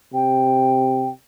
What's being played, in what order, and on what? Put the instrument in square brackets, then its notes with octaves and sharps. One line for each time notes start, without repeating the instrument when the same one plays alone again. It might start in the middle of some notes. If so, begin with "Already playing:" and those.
[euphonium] C3 [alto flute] G5